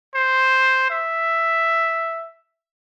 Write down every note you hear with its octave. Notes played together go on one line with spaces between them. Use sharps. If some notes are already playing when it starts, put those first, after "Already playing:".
C5
E5